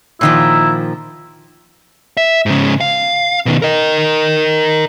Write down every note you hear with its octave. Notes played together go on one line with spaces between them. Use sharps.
A#2 D#3 F3 E4
E5
G#2 C#3
F5
B2 D#3
A#4 D#5